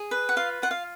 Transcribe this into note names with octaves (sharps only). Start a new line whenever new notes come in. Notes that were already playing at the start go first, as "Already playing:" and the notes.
Already playing: G#4
B4
F#5
F4 F5
F4 F#5
F5